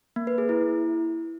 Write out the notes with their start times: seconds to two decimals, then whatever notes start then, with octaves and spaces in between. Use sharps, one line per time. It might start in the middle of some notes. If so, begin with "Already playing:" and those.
0.16 A#3
0.27 B4
0.38 G#4
0.49 E4